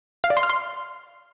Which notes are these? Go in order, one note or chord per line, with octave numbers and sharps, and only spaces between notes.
F5
D5
C6
F6
C6